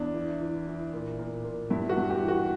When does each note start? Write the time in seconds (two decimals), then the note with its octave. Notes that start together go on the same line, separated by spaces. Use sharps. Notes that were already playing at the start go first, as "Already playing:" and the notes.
Already playing: E2 D4
0.14 E3
0.41 E3
0.67 E3
0.93 A#2
1.19 A#2
1.44 A#2
1.70 G2 E4
1.89 F#4
1.97 G2
2.10 G4
2.22 E3
2.28 F#4